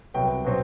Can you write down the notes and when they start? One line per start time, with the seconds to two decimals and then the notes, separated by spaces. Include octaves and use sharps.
0.14 C2 C3 F#3 B3 G5
0.45 B2 F#3 C4